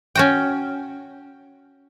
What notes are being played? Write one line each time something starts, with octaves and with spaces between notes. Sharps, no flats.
C#4 F#4 G5